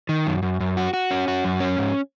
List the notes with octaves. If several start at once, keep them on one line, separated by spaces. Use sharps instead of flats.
D#3
F#2
F#2
F#2
F#4
F#4
C#4
F#4
F#2
C#4
G#2